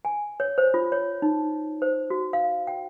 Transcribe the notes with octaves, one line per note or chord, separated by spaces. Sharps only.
G#5
C#5
C5
F4
C#5
D#4
C5
F#4
F5
G5